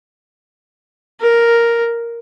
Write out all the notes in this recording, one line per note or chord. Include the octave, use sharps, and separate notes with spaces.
A#4